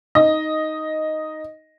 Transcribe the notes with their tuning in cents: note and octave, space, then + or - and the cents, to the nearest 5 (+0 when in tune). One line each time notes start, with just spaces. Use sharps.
D#4 +5 D#5 +0